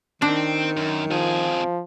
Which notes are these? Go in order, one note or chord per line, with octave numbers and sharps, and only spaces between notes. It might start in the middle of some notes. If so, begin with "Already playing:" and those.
D#3 C4 D4
F#2
F2 F3 G#4